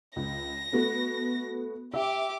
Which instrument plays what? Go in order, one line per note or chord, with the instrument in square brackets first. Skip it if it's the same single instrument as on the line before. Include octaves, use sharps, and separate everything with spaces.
[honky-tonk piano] C#2 [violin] A#6
[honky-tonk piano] A3 B3 F#4
[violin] G4 D6 [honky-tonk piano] E5